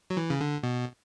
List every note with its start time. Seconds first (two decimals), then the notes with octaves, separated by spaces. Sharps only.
0.10 F#3
0.17 E3
0.30 C#3
0.41 D3
0.63 B2